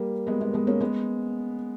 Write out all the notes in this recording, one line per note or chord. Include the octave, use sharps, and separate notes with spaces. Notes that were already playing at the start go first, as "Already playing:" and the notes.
Already playing: G3 A#3
G#3 B3
G#3 B3
G#3 B3
A#3 C#4
G#3 B3